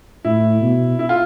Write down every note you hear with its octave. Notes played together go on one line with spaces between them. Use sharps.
A2 E4
B2
E4
F4